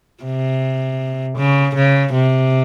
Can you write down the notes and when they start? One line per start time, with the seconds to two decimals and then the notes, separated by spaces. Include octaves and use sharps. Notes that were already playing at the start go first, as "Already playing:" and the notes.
0.24 C3
1.37 C#3
1.75 C#3
2.13 C3